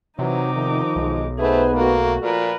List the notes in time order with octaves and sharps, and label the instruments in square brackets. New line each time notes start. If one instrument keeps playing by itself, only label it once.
[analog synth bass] C3 [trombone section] E3 [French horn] F#3 [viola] D#4 D6
[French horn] E2 [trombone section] D#3 F3
[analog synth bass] B1 [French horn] G#3
[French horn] A3 [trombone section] B3 D#4 B4 [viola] G#4 C5
[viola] A3 F#4 [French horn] A#3
[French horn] A#2 [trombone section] F3 [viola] A#4 B4